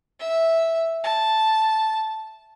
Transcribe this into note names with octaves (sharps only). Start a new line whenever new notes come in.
E5
A5